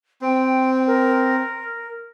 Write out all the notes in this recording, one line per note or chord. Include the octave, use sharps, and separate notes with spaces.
C4 G5
A#4